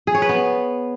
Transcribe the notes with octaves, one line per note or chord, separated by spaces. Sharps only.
G#4
C#5
B4
B3